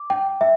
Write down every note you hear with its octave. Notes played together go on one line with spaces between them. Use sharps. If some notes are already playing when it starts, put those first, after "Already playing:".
Already playing: D6
G5
E5